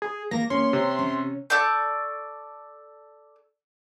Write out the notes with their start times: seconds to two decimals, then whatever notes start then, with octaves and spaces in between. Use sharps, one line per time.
0.02 G#4
0.31 A#3 A#4 A#6
0.50 A#3 C#4 C#5 C6
0.73 C3
0.99 C#4
1.50 A4 D5 C#6 G6